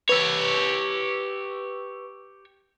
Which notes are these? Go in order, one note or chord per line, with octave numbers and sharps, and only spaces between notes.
G4 B4 C#5 C#6 E6